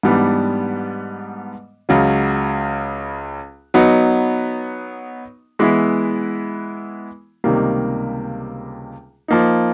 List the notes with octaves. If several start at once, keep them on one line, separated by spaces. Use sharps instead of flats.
G#2 E3 G3 B3 D4
C#2 C#3 F#3
F#3 B3 D#4
E3 G#3 B3 E4
C#2 C3 D#3 G3 A#3
F3 A#3 D#4